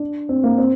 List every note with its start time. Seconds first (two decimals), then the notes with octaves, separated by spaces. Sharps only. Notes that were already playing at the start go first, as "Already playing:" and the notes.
Already playing: D4
0.29 C4
0.44 A#3
0.58 C4